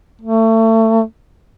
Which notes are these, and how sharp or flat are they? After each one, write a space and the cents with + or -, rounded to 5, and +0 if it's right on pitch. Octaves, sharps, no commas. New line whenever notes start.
A3 +30